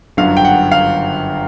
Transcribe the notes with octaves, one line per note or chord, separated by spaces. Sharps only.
G1 F#2 D3 F#3 F5
G5
F#5
F5